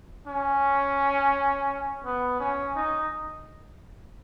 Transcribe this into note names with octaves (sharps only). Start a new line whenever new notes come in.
C#4
B3
C#4
D#4